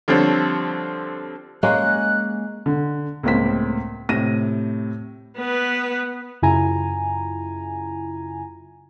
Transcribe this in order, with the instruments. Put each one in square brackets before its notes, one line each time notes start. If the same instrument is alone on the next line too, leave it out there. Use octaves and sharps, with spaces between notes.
[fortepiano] D3 F3 G3 C4 A4 C#5
[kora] G#3 A#3 C#4 [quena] F#6
[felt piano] D3
C#2 A2 A#3 C4 B6
A2 C3 A#6 D#7
[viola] B3 B4
[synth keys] F#2 C#3 E4 F4 G#5 A#5